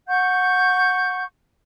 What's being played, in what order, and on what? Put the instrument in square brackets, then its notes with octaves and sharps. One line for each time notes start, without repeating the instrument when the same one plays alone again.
[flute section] F#5 C#6 G6